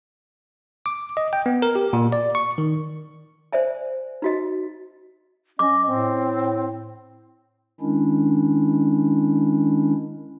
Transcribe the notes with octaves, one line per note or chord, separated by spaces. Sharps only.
D6
D#5
G5
B3
A#4
G4
A#2
D5
C#6
D#3
C5 D5 E5 G#5
D#4 F#4 D#5
C#4 D#5 D6
A2 C4
D#3 G#3 C#4 D4 E4